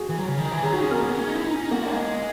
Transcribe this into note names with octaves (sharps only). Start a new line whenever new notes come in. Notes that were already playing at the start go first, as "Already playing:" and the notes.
Already playing: F#4 G#4
E3
F#3
C#3
D#3
E3
F#3 G#4
D#4 F#4
C#4 G#4
B3 A#4
A#3 G#4
B3
C#4
D#4
E4
D#4
C#4
D#4
A#3 F#4
G#3